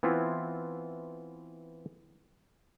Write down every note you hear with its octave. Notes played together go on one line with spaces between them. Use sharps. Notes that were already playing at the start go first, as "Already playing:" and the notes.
E3 B3 C4 E4 F4